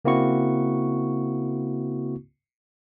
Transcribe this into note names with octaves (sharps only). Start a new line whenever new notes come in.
C#3 A#3 C4 E4 F#4 C#6